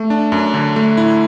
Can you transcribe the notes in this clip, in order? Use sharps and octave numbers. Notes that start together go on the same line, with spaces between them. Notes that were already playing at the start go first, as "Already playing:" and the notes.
Already playing: A3
D4
F#2
D3
A3
E4